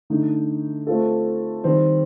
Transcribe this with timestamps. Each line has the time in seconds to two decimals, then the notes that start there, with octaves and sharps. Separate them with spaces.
0.10 D3 A3 D#4
0.87 A3 C4 F4 A4
1.64 D#3 G3 C4